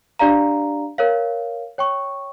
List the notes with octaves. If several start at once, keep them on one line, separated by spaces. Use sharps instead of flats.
D4 G4 D5 F5 A#5
A#4 C#5 F5
C#5 G5 C#6